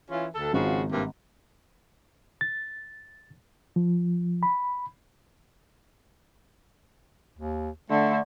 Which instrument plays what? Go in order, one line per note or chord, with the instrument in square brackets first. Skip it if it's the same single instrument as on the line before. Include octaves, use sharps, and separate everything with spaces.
[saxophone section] E3 C#4 F4
D2 A4
[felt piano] G#1 [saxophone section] C#3 F3 F#4
[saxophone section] G2 C3 A#3
[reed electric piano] A6
F3
B5
[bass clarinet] D#2
[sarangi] D3 [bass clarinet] A3